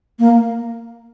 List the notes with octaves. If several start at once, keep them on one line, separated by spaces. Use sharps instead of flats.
A#3